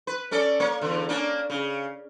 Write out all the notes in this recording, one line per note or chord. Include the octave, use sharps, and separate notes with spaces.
B4
C#4 A4 D5
A#3 C#5
E2 D3
A#3 C#4 D4
C#3